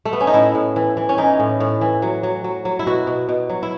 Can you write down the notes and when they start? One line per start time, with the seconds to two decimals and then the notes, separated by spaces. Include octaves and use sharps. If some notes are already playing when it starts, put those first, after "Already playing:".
0.05 A3
0.13 B3
0.21 C#4
0.27 D#4
0.34 A2 E4
0.55 A2
0.76 E3
0.97 E3
1.09 C#4
1.18 E3 D#4
1.40 A2
1.60 A2
1.81 E3
2.02 F#3
2.23 F#3
2.44 F#3
2.65 F#3
2.79 E4
2.87 B2 F#4
3.07 B2
3.29 B2
3.50 F#3
3.63 E4